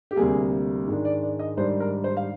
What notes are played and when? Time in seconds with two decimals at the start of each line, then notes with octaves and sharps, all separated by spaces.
0.11 G4
0.16 D2 C3 G3 A#3 G#4
0.87 G#2 D#3 G#3 D4
1.05 D5
1.23 D5
1.39 D#5
1.57 G#2 D#3 G3 D4 C5
1.80 A#4
2.04 C5
2.17 F5